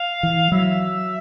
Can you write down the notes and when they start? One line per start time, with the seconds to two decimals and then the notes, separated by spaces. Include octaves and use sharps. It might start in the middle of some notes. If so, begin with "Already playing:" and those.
Already playing: F5
0.23 E3
0.52 F#3 E5